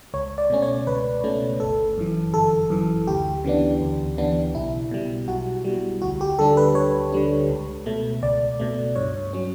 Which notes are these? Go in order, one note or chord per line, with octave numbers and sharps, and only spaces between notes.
C#2 C#5
D5
B2 A3 C#4
C#5
C#2 B4
B2 A3 C#4
G1 A4
F#2 E3
G1 A4
F#2 E3
D2 G4
C#3 E3 B3 D4
D2
C#3 E3 B3 D4
B1 E4
B2 G3
B1 F#4
B2 G3
D2 F#4
G4
D3 G3 D4 A4
B4
D2 C#5
D3 G3 D4
C#2
B2 A3
C#2 D5
B2 A3
G2 C#5
F#3 C#4